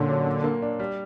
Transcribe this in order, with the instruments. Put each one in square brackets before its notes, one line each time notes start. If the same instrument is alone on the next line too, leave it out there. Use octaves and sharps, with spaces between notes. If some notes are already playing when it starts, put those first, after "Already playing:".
Already playing: [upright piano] A#2 C#4 [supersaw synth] D3
[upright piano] F#3
A#2
A#3
D4
G3